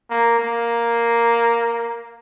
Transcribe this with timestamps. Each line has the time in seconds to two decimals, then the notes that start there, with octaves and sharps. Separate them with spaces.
0.10 A#3
0.39 A#3